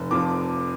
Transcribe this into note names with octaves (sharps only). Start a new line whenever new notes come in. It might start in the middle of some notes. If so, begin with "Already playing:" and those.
Already playing: F1
F2 F3 D6